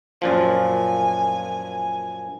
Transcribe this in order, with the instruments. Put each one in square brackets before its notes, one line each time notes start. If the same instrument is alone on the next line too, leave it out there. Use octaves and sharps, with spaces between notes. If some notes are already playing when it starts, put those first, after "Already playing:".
[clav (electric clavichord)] F#2 A#2 F3 [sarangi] G#5